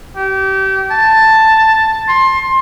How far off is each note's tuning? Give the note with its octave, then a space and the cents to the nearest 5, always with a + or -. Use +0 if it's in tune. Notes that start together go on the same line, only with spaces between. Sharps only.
G4 -30
A5 +5
C6 +25